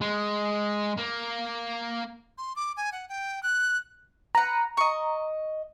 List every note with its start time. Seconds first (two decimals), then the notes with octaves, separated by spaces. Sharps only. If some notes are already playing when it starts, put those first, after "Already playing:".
0.01 G#3
0.97 A#3
2.38 C6
2.56 D6
2.77 G#5
2.92 F#5
3.09 G5
3.43 F#6
4.35 B4 F#5 A#5
4.77 D#5 C#6